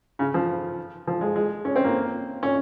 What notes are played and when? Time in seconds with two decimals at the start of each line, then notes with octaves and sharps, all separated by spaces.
0.19 C#3
0.34 F3
1.07 F3
1.21 G#3
1.36 G#3
1.65 C#4
1.76 C4
1.84 A#3
2.43 C#4